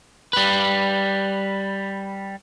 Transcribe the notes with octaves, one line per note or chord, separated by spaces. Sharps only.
G3 B4